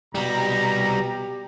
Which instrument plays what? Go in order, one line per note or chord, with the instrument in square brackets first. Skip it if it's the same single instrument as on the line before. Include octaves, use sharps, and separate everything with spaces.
[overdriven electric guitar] C2 G3 [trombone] B2 [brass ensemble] G4 [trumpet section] A#5